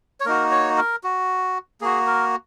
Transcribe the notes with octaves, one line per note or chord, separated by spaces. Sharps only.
C#5
A#3 D#4 F#4 A#4
C#5
A#4
F#4
A#3 F#4 G#4
A#4